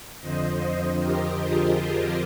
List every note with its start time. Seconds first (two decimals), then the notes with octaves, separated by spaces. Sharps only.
0.20 F2 D3 F3 C5 D#5
0.60 C5 D#5
1.00 G4 A#4
1.40 F4 G#4
1.80 F4